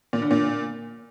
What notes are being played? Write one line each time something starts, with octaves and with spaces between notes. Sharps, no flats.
A#2
D3
A#2